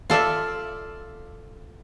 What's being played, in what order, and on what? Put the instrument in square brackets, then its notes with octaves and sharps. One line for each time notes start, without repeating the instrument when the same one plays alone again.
[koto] F4 A4 D5 E5